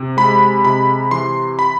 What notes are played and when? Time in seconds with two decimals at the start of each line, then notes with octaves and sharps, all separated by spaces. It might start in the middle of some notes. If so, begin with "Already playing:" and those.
Already playing: C3
0.17 G#3 B5
0.64 C3 B5
1.11 E3 C6
1.59 B5